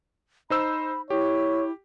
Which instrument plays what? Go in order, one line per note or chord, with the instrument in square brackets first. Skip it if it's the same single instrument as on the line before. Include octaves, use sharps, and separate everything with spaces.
[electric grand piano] D#4 C5 E6 [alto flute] B5
[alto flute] E4 [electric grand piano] G4 [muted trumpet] C#5